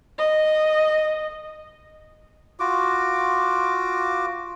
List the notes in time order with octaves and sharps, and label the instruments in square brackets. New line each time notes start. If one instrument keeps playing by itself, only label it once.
[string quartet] D#5
[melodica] F4 F#4 D6